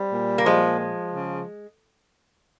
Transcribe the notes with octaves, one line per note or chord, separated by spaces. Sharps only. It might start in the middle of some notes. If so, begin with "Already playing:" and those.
Already playing: G3 C4
A#2
A#3
F3 G#3
F3
C#3